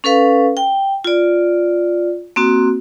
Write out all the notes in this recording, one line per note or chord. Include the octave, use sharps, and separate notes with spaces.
C#4 A4 B4 F5
G5
F4 D5
A#3 C4 F#4